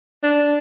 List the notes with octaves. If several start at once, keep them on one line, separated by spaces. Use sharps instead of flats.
D4